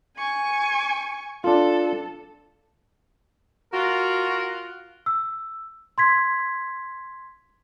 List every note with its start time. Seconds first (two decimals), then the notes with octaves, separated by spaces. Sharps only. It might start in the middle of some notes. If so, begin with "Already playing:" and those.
0.17 G#5 C#6
1.44 D4 F4 A4
3.73 F4 F#4 A#4 F#5
5.06 E6
5.98 C6 G#6 B6